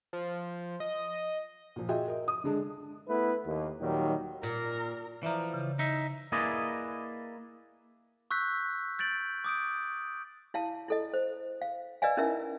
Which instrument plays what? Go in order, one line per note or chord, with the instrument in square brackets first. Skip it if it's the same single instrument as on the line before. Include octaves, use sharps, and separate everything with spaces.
[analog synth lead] F3
D#5
[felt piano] A#2 F3
F4 F#4 G#4 D#5 E5 G5
A#4 D#5
D#6
D3 G#3 D4
[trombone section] A3 B3 E4 B4
D#2
D#2 A#2 D#3 F#3 G3
[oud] A#2 [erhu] A#4
[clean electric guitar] E3 F3 [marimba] D5 E5 A#5
[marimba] C#3
[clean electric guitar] D#4 E5
A#3 E4 G#4 B4 D5 D#5
[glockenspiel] C#6 E6 F#6 G6 B6
G6 A6 D7 F#7
D6 D#6 G6 D7
[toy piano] E4 F5 A5
E4 A4 D#5
C5
F5
B4 D5 D#5 F5 G#5
C#4 D#4 E4 A#4 E5 E6